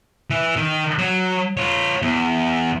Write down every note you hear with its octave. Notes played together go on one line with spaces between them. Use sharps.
E3
D#3
F#3
F4 C#5
E2